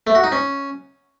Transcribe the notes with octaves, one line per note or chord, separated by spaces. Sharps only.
A3
F#4
D#4
C#4